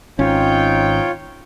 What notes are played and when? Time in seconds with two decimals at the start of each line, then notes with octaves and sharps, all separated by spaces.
0.19 G#1 C4 C#4 D#4 F4 C#5 G5